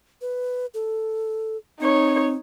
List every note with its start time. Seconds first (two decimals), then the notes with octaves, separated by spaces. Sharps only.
0.21 B4
0.74 A4
1.80 C4 D#4 C#5